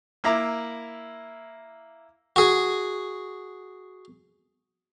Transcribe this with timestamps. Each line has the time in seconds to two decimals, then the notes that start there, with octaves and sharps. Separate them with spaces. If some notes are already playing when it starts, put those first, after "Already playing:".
0.24 A#3 E4 A#5 D6 E6
2.36 F#4 G#4